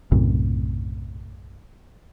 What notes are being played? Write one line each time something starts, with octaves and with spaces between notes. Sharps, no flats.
B1 F#2 A2 C3